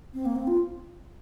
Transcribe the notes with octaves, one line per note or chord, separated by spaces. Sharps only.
C4
A#3
C4
F4